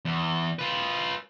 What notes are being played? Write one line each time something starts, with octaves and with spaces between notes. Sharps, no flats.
E2
F4 B4